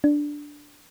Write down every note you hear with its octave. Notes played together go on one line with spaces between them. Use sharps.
D4